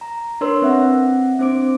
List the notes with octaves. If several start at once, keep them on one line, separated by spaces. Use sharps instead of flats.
A#5
D4 A#4 B4 C#5 C6 E6
C4 E5 F#5
C4 D4 C5 D6 D7